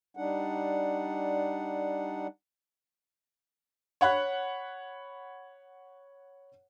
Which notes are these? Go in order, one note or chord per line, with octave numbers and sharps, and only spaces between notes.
G3 D4 D#4 F#5
C#5 F#5 B5 F#6